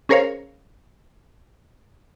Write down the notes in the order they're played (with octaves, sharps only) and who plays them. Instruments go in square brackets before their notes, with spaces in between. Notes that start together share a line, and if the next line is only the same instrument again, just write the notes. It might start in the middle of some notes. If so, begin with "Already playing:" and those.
[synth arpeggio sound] C#4 G#4 A#4 C5 C#5 F5